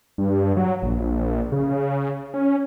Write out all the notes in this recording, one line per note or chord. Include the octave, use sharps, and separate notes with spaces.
G2
F#3
A#1
C#3
C#4